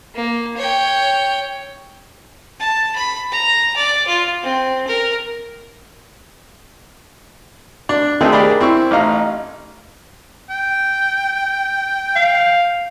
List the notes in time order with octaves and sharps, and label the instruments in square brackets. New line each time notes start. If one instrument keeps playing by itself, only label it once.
[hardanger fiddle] A#3
C#5 G5
[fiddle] A5
B5
A#5
D5
F4
C4
A#4
[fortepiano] D4
D#3 A3 C4 D#4 G#4
D4 G4 G#4 A#4 D5 B5
C4 E4 C#6
A1 D#4 F5 A#5
[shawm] G5
[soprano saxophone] F5